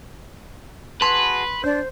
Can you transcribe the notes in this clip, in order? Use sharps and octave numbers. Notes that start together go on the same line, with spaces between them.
F#4 G#4 B4 A5 C6
D4 C5